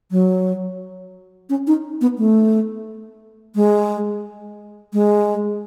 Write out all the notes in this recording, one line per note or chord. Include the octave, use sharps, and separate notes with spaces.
F#3
C#4
D#4
B3
A3
G#3
G#3